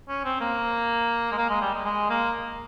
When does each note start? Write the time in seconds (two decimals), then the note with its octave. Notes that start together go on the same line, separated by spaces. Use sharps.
0.09 C#4
0.25 C4
0.41 A#3
1.32 G#3
1.38 A#3
1.50 G#3
1.62 G3
1.74 G#3
1.85 G#3
2.10 A#3